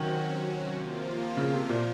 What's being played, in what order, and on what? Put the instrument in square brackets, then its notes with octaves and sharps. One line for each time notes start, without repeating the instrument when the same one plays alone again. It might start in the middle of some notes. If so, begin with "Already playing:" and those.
Already playing: [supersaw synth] C3 F#3 C#4 F#4 [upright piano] D#3
[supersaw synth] C3 F3 A#3 F4
[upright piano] C#3
C3
A#2